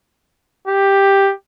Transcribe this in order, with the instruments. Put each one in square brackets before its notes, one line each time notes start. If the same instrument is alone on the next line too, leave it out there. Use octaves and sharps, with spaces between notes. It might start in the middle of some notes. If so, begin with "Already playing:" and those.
[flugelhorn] G4